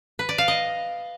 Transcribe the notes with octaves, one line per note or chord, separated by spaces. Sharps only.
B4
D5
F5
D#5